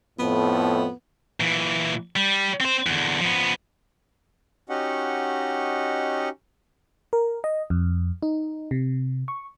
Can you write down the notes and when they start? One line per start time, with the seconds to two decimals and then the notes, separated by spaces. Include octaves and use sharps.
0.19 F2 A2 B3
1.40 A#2 E3
2.16 G3
2.61 C4 C5
2.87 E2 D3
3.21 F3 B3
4.69 C#4 D#4 F#4 G4 D#5 F#5
7.13 A#4
7.44 D#5
7.70 F2
8.23 D#4
8.71 C3
9.28 C#6